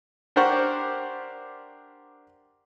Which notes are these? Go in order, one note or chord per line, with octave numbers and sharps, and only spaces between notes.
D4 G4 A#4 C5 F#5 C#6